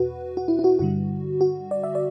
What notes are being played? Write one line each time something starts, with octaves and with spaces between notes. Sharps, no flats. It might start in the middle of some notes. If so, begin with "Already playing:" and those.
Already playing: E2 B2 F#4 B4
F#4
E4
E4
F#4
G2 D3 G3 F#4
F#4
D5
E5
D5